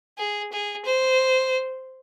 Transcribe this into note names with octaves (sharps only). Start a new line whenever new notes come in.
G#4
G#4
C5